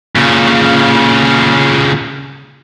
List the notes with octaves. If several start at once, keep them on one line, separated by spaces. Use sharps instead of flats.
A#2 C#3